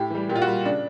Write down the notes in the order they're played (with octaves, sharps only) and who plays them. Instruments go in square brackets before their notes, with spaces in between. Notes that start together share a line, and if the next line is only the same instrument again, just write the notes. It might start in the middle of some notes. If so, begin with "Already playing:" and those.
Already playing: [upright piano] A2 G4
E3 G3
A#2 G4
F4
F#4
G3
C#3 D4